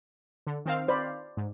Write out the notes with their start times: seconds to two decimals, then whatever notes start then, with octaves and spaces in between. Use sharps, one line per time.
0.47 D3
0.66 D#3 C4 F5
0.88 C5 D5 B5
1.37 G#2